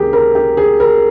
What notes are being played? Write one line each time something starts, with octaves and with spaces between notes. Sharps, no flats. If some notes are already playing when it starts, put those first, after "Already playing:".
Already playing: C#2 C3 D#3 A#3 C#4 G4 G#4 A#4
A#4
G4
G#4
A#4